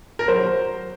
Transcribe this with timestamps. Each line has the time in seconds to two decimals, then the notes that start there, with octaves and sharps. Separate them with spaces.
0.19 A#4
0.28 F#3 C5